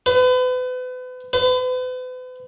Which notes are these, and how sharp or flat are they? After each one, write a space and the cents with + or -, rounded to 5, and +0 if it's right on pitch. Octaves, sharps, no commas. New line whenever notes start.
B4 +35
B4 +40